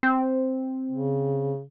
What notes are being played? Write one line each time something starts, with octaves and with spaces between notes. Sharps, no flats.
C4
C#3